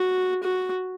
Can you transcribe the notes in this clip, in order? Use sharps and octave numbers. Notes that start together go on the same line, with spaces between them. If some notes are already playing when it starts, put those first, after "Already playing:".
Already playing: F#4
F#4